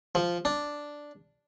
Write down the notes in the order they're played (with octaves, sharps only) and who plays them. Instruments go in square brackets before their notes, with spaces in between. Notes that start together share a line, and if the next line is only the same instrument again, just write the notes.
[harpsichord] F3
D4